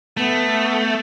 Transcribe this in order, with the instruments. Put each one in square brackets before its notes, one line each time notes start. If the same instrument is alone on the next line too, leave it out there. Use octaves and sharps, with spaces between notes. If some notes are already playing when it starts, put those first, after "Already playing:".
[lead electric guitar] A3 [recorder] B3